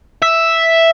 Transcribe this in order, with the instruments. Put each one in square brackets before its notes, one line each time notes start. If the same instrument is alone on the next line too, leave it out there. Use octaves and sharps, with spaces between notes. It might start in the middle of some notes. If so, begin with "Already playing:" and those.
[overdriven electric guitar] E5